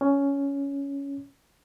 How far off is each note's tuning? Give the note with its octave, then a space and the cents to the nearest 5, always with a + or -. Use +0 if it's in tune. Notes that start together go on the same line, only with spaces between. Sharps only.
C#4 +10